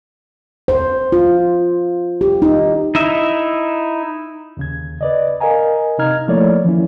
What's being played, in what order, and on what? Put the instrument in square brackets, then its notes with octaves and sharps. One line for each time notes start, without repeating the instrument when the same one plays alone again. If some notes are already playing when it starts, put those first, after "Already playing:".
[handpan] C5
F4
G4
D#4
[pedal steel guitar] D#4 E4 E5
[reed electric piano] D#2 C#3 G#6
B4 D5 D#5
A#4 D#5 F5 G#5 A#5
C3 D#4 D#5 A#5 F6 G#6
F3 A3 A#3 E4 C#5 D5
E3 F3 A#3 C#4 E4